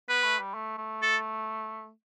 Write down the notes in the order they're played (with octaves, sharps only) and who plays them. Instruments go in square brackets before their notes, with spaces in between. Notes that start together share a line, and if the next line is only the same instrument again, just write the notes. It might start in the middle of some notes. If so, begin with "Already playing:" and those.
[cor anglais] B3 [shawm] B4
[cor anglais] A3
G3
A3
A3
[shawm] A4